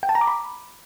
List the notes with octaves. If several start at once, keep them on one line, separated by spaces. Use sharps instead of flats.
G5
A5
A#5
D6
B5